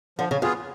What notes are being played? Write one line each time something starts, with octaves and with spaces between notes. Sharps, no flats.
D3 F3
C#3
F2 B3 F4 G#4